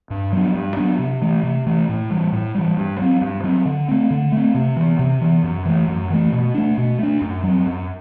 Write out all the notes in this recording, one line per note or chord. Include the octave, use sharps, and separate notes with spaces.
G2
F#3 B3 D4
G2
F#3 B3 D4
C3
E3 A3
C3
E3 A3
A2
E3 G3
A2
E3 G3
G2
F#3 C4
G2
F#3 C4
D3
A3 C4
D3
A3 C4
C3
E3 B3
C3
E3 B3
F#2
E3 A3
F#2
E3 A3
B2
A3 D4
B2
A3 D4
F#2
F#3 C4
F#2